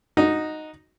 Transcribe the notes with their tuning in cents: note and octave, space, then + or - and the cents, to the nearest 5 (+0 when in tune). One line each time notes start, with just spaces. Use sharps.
D#4 -5 F#4 -10